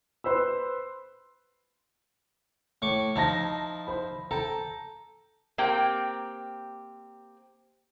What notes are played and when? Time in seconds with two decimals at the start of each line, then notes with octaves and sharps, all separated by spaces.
0.24 B4 C5 B5 E6
2.82 A2 C#6 D6
3.16 F3 D#4 E4 A5 A#5 A#6
3.87 C5 B5
4.31 A4 G5 A#5
5.58 A#3 C4 G4 G5